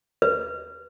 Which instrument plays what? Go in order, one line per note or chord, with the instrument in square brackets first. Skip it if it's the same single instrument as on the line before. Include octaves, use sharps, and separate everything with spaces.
[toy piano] B4